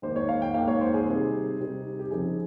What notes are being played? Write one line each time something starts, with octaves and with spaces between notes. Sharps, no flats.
G#2 D#3 A#3 D#4 C5
C#5
F5
G5
G#2 D#3 A#3 D#4 F5
C#5
C5
G#4
C3 G3 C4 D#4
C3 G3 C4 D#4
G4
C#3 F3 C4 D#4 G#4